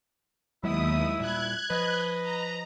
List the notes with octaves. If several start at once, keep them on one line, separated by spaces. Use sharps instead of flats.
D#2 F#3 G#3 B3 E4 D#6
A#2 G3 F#6 G#6
F3 B4 D#5
A#5